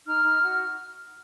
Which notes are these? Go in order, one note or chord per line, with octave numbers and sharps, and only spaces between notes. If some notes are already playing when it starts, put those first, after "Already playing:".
D#4 F6
D#4
F#4